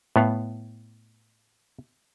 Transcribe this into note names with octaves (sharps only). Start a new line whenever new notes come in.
A2 B3 F5